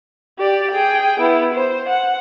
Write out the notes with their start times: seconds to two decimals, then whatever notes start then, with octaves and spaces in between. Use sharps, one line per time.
0.39 G4 D5
0.71 G#4 G5
1.19 B3 E4
1.53 C5
1.88 F#5